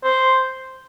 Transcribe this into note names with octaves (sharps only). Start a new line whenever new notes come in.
C5